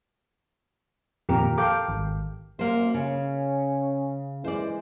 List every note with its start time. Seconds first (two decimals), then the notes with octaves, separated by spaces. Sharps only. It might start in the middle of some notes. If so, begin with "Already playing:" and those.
1.29 F2 A#2 D#3 G4 A#4
1.58 A4 F5 G5 D6
1.88 G#1
2.59 F#2 A#3 C5
2.94 C#3 C#4
4.44 E3 G#3 C5 D5